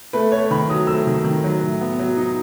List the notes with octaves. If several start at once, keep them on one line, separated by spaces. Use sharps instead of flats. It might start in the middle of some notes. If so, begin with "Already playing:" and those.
A3 B4
A3 C#5
D#3 B5
F#3 D#6
A3 E6
D#3
D#3
F#3
A2
B3
F#3
D#4